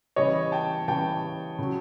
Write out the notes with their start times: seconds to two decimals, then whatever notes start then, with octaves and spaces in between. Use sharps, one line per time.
0.16 C#3 E3 G3 C#5 D#5
0.52 G5 A5
0.88 C#3 E3 G3 G5 A5
1.59 C#3 F#3